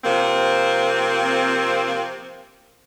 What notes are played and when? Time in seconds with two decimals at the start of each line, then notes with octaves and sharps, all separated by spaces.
0.04 C3 F3 A#3 C4